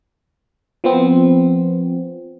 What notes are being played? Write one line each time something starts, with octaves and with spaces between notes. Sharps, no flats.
F3 B3 C4